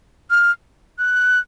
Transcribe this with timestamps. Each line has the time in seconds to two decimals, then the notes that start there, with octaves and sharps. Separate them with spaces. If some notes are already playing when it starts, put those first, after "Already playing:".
0.30 F6
0.99 F#6